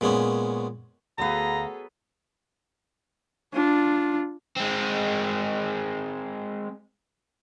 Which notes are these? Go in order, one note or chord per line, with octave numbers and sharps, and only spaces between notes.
A#2 G#3 B3 C#4
D2 F#3 B3 G#4 A4 B4 F5 A#5
D4 F4
G#3 C4